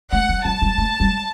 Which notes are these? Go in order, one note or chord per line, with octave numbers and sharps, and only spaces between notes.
A3 F#5
F#3
F#3 A5
G3
A3
G3